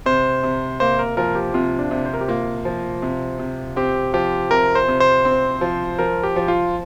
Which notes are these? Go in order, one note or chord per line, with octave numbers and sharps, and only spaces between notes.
C3 C5
C3
A#3 C5
A#4
F3 A#4
G4
C3 F4
D4
C3
C5
A#4
G4
A#3 F4
F3
C3
C3
C4 G4
F3 G4
C3 A#4
C5
C3
C5
C4
F3
F3 A#4
G4
F3
F4